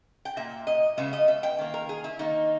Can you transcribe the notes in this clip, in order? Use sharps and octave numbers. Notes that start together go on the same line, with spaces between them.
G5
A#2 A#3 E5
D#5
C#3 G#3 B3 E5
D#5
E5
G5
D#3 A#3
A#4
G#4
E4
D#3 A#3 D#4